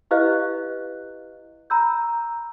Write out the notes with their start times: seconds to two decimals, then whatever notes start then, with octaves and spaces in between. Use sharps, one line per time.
0.11 E4 G4 B4 D#5 F5 F#6
1.70 A#5 B5 E6 G6